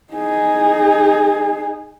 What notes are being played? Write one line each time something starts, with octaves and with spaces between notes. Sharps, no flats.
D#4 G#4